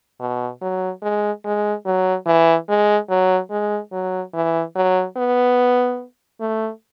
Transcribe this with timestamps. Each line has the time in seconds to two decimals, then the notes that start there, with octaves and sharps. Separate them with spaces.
0.20 B2
0.61 F#3
1.02 G#3
1.45 G#3
1.86 F#3
2.27 E3
2.69 G#3
3.10 F#3
3.51 G#3
3.92 F#3
4.34 E3
4.76 F#3
5.17 B3
6.41 A3